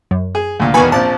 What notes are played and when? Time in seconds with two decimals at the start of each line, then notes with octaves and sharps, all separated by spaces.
0.11 F#2
0.35 G#4
0.60 D2 A#2
0.74 E2 B2 D#3 B4 G#5 C#6
0.92 A#1 F3 C4 A5